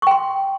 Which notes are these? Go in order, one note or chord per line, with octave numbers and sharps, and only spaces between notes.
G5 C6 C#6